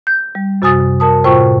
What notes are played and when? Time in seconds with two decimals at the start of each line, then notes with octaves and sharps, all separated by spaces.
0.07 G6
0.35 G3
0.62 F#2 C3 F#4 G#5 D#6 A6
1.00 A#4 A5 D#6
1.24 A2 C3 F4 C5 G5 C#6